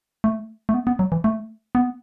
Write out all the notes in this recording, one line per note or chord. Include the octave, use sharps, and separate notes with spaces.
A3
A3
B3
B3
F#3
E3
A3
B3